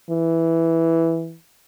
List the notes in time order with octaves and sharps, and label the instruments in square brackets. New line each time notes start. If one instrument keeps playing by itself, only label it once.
[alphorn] E3